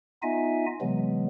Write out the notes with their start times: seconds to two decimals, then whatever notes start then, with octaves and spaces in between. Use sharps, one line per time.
0.23 B3 D#4 F4 D#5 E5 G#5
0.81 C3 E3 F#3 G#3 B3